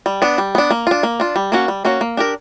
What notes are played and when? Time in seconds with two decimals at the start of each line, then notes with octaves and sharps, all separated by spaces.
0.06 G3
0.22 B3 D4
0.38 G3
0.55 B3 D4
0.71 A#3
0.87 D4 F4
1.03 A#3
1.20 D4 F4
1.36 G3
1.52 A#3 C#4 F#4
1.68 G3
1.85 A#3 C#4 F#4
2.01 A#3
2.17 D4 G4 A#4